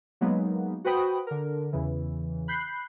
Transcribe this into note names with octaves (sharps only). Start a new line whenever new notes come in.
F#3 G#3 A#3 B3 D#4
F#4 B4 C5 G5 B5 D#6
D3 A#4
E2 C#3 E3
B5 F#6 G6 C7